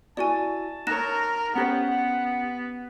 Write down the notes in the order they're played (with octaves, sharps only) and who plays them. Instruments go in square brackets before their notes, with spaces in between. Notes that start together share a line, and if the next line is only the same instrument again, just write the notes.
[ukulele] E4 F#4 [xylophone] D5 G#5 [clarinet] A5
[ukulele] D#4 C#5 [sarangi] A#4 [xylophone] F#6 A#6 E7
[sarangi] B3 [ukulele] C#4 G4 C5 [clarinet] F#5
[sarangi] B3